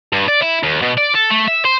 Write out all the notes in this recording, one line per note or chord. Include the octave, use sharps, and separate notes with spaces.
G2
D5
E4
D#2
B2
D5
A4
A3
E5
C5